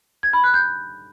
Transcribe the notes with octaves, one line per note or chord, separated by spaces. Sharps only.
G#6
B5
F#6
G6